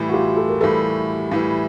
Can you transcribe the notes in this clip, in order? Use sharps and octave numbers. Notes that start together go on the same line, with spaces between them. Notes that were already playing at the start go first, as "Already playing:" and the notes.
Already playing: A2 E3 G3
F#4
F4 G4
G4 A4
A#4
A2 E3 G3 A4 B4
A2 E3 G3